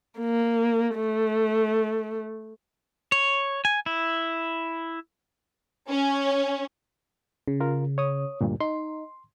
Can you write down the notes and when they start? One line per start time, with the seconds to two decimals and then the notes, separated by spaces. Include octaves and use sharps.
0.19 A#3
0.96 A3
3.12 C#5
3.65 G#5
3.86 E4
5.90 C#4
7.48 C#3
7.60 F4 A#4
7.98 C#5 D#6
8.41 D2 G2 A#2
8.61 D#4 C6